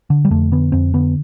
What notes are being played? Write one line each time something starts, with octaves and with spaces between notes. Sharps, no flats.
D3
G3
F2 A3
D3 B3
F2 C4
D3 B3